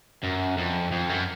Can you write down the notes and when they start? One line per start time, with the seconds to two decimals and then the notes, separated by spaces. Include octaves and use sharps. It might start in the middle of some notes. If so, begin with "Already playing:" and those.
0.23 F#2
0.58 F2
0.92 F2
1.10 F#2